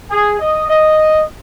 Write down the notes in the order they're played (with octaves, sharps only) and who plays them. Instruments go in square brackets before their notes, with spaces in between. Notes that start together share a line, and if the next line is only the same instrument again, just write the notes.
[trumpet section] G#4
D#5
D#5